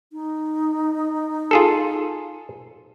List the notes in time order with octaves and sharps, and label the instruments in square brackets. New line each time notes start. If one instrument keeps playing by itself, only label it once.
[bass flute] D#4
[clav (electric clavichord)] F4 G#4 A4